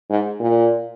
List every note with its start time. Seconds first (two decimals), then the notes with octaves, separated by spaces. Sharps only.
0.09 G#2
0.40 A#2